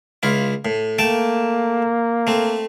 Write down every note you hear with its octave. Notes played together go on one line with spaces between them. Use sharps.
C#2 E4 F4
A2
A3 A#3 G5 A5
A3 C4